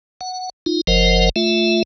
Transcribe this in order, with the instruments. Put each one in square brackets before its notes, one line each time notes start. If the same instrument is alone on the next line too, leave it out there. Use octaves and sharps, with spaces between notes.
[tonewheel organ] F#5
D#4 F4
F#1 F3 A#4 C5 D#5 F#5
A3 F4 E5